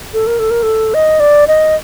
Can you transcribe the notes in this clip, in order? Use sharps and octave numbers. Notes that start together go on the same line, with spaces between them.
A4
A#4
A4
A#4
A4
D#5
D5
D#5